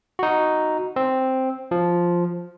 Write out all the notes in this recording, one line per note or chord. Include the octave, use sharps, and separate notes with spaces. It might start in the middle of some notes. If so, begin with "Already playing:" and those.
D#4 F#4
C4
F3